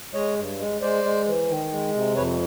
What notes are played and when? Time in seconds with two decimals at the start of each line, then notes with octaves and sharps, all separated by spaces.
0.14 G#3 C#5 D#5
0.37 G2
0.59 G#3
0.81 G#3 C5 D5
1.04 G#3
1.26 E3
1.48 D#3
1.71 G#3
1.94 C3
2.16 F2 B4 C#5